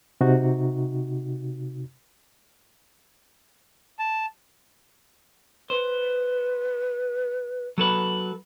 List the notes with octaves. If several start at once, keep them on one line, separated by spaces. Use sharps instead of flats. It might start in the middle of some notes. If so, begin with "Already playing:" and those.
C3 D#4 F#4
A5
B4 C5
F#3 A4 B4